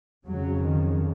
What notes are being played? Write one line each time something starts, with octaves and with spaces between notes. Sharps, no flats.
F2 C#3 F#3
D#3